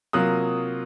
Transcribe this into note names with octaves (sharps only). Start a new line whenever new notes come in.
C3 F#3 A#3 F4 D#6 F#6